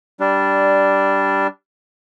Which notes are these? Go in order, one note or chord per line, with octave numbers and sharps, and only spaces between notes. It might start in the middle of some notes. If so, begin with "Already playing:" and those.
G3 D4